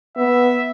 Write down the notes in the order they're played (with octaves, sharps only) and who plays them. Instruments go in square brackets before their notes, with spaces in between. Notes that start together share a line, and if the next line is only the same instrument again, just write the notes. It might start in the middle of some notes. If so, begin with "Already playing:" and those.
[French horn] B3 [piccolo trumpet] E5